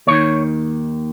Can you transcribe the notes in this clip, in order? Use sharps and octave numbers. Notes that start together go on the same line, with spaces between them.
D#2 D#3 C#5